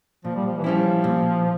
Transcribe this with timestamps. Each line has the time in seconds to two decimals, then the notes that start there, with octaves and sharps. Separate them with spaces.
0.25 A#2 F3
0.36 G3
0.46 F3
0.58 E3
0.64 F3 G3 C#4 E4
1.04 A#2